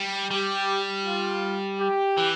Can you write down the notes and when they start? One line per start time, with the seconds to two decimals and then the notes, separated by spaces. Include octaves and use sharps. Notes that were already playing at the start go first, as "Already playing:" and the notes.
Already playing: G3
0.31 G3 G4
1.06 F4
1.80 G4
2.17 E3